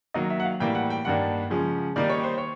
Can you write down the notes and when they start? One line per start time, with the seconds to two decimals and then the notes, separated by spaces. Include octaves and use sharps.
0.14 D#3 F#3 A#3 D#5
0.30 E5
0.40 F#5
0.45 F5
0.60 A2 E3 G3 A#3 G5
0.75 F#5
0.90 G5
1.05 G2 D#3 G3 A#3 D4 F#5
1.50 C#3 F3 G#3 C#4
1.96 D#3 G3 A#3 D#4 D5
2.09 C#5
2.24 C5
2.38 C#5